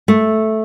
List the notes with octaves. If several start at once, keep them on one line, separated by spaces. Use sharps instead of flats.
A3